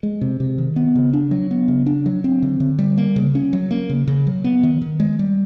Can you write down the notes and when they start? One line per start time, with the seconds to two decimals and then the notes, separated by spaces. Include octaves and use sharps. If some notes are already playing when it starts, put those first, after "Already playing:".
0.03 G#3
0.21 C3
0.40 C3
0.58 D#3
0.76 B3
0.96 C#3
1.13 D4
1.31 F#3
1.51 B3
1.68 C#3
1.86 D4
2.06 F#3
2.24 C4
2.43 D3
2.60 D3
2.79 G3
2.98 A#3
3.16 C#3
3.35 C#4
3.53 F#3
3.71 A#3
3.89 C#3
4.08 C#3
4.27 F#3
4.44 B3
4.63 D#3
4.82 D#3
5.00 G#3
5.19 G3